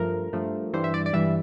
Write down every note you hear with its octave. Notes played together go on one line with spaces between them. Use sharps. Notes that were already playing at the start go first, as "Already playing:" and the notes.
Already playing: G2 F3 A3 A#4
G2 F3 A3
G2 E3 G3 C5
E5
D5
D5
G2 E3 G3 E5